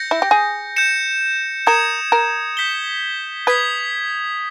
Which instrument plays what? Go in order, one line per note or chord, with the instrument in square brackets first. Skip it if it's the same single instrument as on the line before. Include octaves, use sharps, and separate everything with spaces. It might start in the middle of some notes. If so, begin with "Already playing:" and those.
Already playing: [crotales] G6 A#6 C#7
[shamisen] E4
G4
G#4
[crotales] G6 C#7 E7
[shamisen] A#4 [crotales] D#6 G#6 C#7 E7
[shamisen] A#4
[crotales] G6 B6 G7
[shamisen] B4 [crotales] D#6 G#6 B6